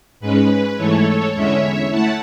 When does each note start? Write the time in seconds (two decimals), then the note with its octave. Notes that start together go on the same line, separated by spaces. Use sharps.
0.20 G#2 G#3 C#4 B4
0.77 G#2 E3 A3 E4 A4 C#5
1.34 E2 D3 G#3 C#4 E4 C#5 E5
1.91 A3 E4 F#5 A5